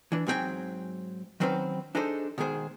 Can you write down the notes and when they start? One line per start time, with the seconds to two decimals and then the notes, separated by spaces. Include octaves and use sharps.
0.12 E3 D4
0.27 G#2 F#3 C4 G4 G5 G#5
1.40 D#3 F#3 C4 C#4 B4 C5
1.95 D4 D#4 G#4 A4 C5
2.38 B2 D#3 G#3 G#4 C5